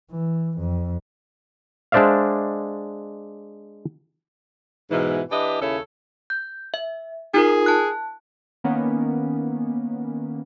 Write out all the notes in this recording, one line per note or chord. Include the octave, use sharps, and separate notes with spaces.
E3
F2
G#3 D4 C5 D5 E5 F5
G#2 B2 E3
E3 D4 E4 G4 B4 D#5
D#2 C#3 E4 A4 C#5
G6
E5
D#4 F4 G#4 A#4
A5 F#6
D#3 A#3 B3 C#4